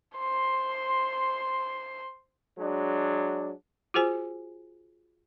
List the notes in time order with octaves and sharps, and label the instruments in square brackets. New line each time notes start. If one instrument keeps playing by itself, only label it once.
[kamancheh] C5 C6
[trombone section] F#3 G#3 D4
[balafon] F4 F#4 G#4 C5 G#5